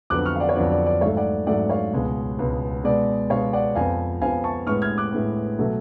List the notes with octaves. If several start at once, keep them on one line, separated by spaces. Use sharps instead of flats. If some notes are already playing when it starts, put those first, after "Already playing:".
F2 D3 F#3 B3 D6 F#6
C#6 F6
F5
D5 F#5
C#5
F2 D3 F#3 B3 D5
D5
D5
G#2 F#3 A3 C#5 F5
D5 F#5
G#2 F#3 A3 D5 F#5
C#5 F5
C#2 B2 G#3 B3
C#2 B2 G#3 B3
B2 G#3 B3 D5
B2 G#3 B3 C#5 F5
D5 F#5
F2 F3 B3 F5 G#5
F2 F3 B3 F5 G#5
A5 C#6
A2 G#3 B3 C#6 F6
F6 G#6
D6 F#6
A2 G#3 B3
B2 F#3 A3